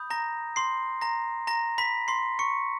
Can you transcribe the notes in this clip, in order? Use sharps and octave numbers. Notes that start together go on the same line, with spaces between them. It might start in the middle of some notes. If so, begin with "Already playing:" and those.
Already playing: B5 D#6 G6
A#5 A#6
C6 C7
A#5 A#6
A#5 A#6
B5 B6
C6 C7
C#6 C#7